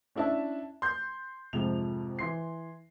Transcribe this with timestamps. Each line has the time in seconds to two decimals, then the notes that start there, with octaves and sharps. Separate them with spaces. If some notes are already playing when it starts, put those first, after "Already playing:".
0.16 C#4 D4 E4 E5 A5
0.82 C6 G6
1.53 F2 G#2 C3 F3 F7
2.19 E3 C6 C7